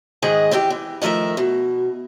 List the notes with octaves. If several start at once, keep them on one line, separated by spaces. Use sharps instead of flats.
G#2 D#3 G#4 D#5 F#5
E3 C4 G4 G5
E3
D#3 F3 A3 A#4 E5
B2